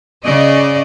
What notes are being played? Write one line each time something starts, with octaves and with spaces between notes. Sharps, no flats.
C#3 D5 D#5